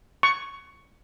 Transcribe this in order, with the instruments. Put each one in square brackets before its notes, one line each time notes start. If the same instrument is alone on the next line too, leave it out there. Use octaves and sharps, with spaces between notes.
[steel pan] C#6